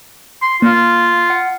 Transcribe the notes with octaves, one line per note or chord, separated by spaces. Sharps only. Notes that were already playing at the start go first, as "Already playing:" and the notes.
C6
A#3 F4
F#5